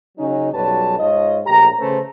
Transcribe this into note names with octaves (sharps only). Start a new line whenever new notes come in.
C#3 F#3 C#4 D#4
B1 F#2 G3 B4 C#5 A5
G#2 F4 C#5 D#5
A#1 A2 G4 A#5
C#3 A3 C#4 B4 C5